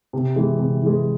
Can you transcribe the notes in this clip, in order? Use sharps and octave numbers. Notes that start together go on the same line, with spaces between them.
C3
E3 G#3
C3
E3 G#3